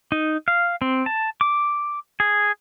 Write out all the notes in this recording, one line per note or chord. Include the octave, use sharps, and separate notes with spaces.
D#4
F5
C4
A5
D6
G#4